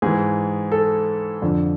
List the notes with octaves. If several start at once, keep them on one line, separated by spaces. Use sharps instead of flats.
G#2 E3 G#4
A4
F2 D3